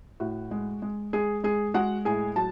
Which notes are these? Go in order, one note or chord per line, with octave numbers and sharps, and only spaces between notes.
A2 F#4
G#3
G#3
G#3 G#4
G#3 G#4
G#3 F#4 F#5
A2 G#4 G#5
F#3 A5